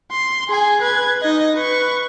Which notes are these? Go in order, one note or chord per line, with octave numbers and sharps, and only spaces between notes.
C6
G#4 G#5
B4 G#6
D#4 D#5
B4 C#6